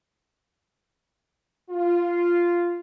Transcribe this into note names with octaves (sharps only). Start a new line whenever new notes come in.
F4